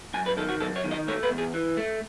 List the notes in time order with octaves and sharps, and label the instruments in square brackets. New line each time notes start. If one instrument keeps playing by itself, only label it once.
[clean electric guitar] F#2 G#5
B4
D#3 A4
F#4
F#2 A4
C#5
D#3
D#5
A3 C#5
B4
E2
G#4
E3
A3